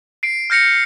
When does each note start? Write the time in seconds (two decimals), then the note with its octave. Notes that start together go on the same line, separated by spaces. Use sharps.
0.23 C7 D7
0.50 F6 G6 A#6 C#7 F7